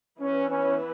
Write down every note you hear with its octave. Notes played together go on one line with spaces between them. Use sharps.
E3 B3 C#4 E4 B4
C#4